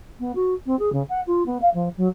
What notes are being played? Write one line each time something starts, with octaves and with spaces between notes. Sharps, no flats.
B3
F#4
C4
G#4
C#3
F#5
F4
B3
F5
F3
F#3